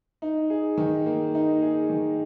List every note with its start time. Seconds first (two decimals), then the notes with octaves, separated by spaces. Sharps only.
0.22 D#4
0.50 G#4
0.78 D#3
1.06 A#3
1.35 D#4
1.62 G#4
1.90 D#3